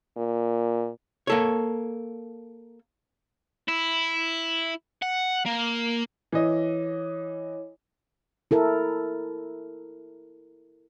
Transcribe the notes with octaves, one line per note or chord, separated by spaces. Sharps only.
A#2
A#3 A4 C#5
E4
F#5
A#3
E3 E4 C#5 D#5 D6
E4 A4 A#4